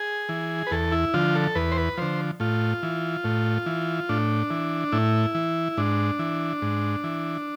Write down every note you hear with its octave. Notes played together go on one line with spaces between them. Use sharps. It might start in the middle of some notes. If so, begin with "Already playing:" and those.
Already playing: G#4
E3
B4
E2 A4
E4
D3 F3 F4
A4
E2 B4
C5
B4
D3 F3 C5
A2 F4
E3
A2
E3
A2 D4
E3
A2 E4
E3
G#2 D4
E3
G#2
E3